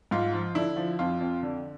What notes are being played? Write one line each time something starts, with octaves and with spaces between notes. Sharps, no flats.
G#2 F4
F3
D3 E4
F3
F2 F4
F2
D3